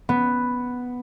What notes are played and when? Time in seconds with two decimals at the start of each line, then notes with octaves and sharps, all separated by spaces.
0.09 B3